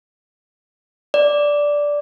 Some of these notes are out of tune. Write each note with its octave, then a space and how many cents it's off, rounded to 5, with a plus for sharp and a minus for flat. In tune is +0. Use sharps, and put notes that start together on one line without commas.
D5 -5